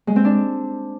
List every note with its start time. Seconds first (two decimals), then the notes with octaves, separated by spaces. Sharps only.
0.07 G#3
0.16 C4
0.25 D4